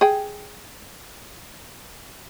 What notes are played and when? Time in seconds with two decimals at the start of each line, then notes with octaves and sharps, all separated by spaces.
0.01 G#4 G5